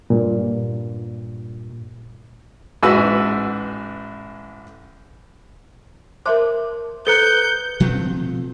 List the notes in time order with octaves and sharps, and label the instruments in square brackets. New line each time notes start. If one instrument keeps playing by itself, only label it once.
[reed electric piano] G2 A#2
[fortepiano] A1 G#2 F#4 B4 E6
[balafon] A#4 E5 D6 [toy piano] C5 A5 C6
[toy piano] A4 C5 A#5 [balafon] B4 [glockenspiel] F#6 C#7 G7 [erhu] G6
[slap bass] B2 F3 A3 C4